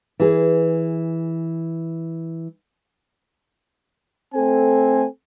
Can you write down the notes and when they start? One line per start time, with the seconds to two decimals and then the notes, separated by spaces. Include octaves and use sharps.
0.20 E3 G#4
4.34 A3 C4 A4 G#5